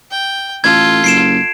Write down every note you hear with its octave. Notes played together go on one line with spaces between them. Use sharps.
G5
A1 F4 A4 G#6
F#1 C7 D7 E7